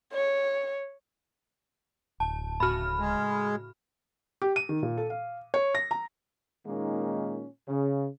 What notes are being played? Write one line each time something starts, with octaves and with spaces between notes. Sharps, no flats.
C#5
D1 A5
A2 C#3 F#4 B5 F6
G#3
G4
D#7
D#3
A#2
A4
F5
C#5
A#6
A#5
A#2 D#3 G#3 A#3 C#4 D#4
C#3